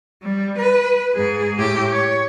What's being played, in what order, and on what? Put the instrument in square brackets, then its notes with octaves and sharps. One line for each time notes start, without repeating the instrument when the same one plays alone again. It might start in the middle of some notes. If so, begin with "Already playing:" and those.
[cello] G3
B4
G#2 G#4
A2 G4
C#5